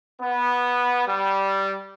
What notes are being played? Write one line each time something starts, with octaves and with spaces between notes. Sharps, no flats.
B3
G3